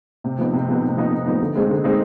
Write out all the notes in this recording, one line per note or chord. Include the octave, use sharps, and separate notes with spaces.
C3
F3 B3 D#4
C3
F3 B3 D#4
C3
F3 B3 D#4
C3
F3 B3 D#4
D3
G#3 C4 D#4
D3
G#3 C4 D#4